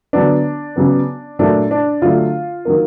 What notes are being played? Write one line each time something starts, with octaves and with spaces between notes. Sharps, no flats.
D3 F#3 B3 D4
C#3 F#3 B3
A#2 F#3 A3 D4
D4
D3 F#3 A3 F4
D#3 F#3 A#3